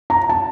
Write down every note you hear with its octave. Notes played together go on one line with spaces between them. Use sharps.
A#5
A5